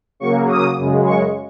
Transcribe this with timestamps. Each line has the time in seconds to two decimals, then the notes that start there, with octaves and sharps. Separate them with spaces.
0.20 C#3 F#3 A#3 C#6
0.48 D#6
0.77 F#2 C#3 G#3
1.06 C#6